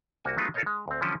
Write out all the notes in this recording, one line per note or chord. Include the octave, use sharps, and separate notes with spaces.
C2 A#3 F#4 G#5
F#3 G#3 A3 B3 D#4 F4
F4 A4 A#4 C5 C#5 D#5
G#3
D2 C4
D3 E3 F3 G3 C#4 E4